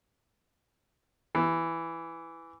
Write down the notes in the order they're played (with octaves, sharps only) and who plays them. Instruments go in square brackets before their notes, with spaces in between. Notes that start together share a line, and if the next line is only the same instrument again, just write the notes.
[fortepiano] E3